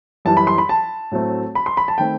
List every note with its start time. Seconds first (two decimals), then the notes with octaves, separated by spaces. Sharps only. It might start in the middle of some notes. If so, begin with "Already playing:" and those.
0.25 F#2 E3 G3 A5
0.37 B5
0.47 C6
0.58 B5
0.69 A5
1.11 A2 F#3 A3 C4
1.55 B5
1.66 C6
1.77 B5
1.88 A5
1.98 D#3 A3 C4 G5